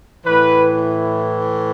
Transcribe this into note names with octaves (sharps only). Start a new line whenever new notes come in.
A2 E3 B4